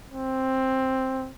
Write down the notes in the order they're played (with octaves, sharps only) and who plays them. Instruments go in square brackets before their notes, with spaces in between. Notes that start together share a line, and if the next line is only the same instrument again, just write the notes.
[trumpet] C4